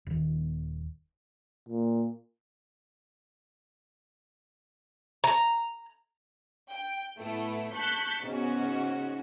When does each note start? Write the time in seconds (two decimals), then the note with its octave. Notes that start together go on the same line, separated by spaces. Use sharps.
0.07 D#1 D#3
1.69 A#2
5.24 A#5
6.71 G5
7.19 A2 A3 B3 E4
7.74 A5 C#6 F#6 G6 B6
8.24 G#2 C#3 B3 C#4 F#4